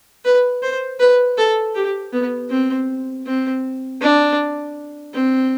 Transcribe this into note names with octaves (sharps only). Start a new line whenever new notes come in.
B4
C5
B4
A4
G4
B3
C4
C4
D4
C4